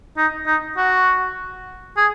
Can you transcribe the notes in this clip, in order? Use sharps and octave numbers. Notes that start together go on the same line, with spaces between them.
D#4
D#4
F#4
G#4